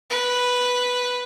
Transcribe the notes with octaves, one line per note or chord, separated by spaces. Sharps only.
B4